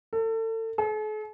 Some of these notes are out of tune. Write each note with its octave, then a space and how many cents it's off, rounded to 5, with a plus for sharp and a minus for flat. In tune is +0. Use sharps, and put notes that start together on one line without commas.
A4 +35
A4 -45